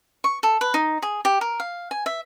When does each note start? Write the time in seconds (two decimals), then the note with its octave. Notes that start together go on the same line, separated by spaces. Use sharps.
0.24 C#6
0.43 A4
0.61 B4
0.74 D#4
1.02 G#4
1.25 G4
1.41 A#4
1.60 F5
1.91 G#5
2.06 E5